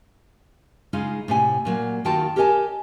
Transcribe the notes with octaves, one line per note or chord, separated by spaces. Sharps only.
C#3 G#3 D#4 F4 F5
A2 C3 G#5
A#2 F#3 A#3
D#2 D#3 F4 F#4 G5 A5
G4 A#4 C#5 D#5 G#5 A5